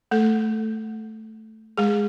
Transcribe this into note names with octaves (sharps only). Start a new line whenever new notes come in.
A3 A4
G#3 G#4